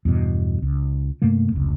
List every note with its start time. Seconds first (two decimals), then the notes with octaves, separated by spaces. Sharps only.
0.05 E2 G2 B2
0.62 C#2
1.22 G2 C3 A3 A#3
1.52 F1 C#2